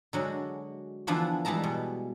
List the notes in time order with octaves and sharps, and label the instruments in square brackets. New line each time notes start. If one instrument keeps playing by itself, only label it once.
[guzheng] D3 F#3 G#3
D3 E3 F3 B3 D4
E3 G3 G#3 A5 A#5
B2